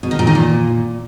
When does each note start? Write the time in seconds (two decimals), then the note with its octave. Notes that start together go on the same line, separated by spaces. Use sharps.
0.03 B2
0.11 D#3
0.19 A#2
0.27 D#3
0.35 A#2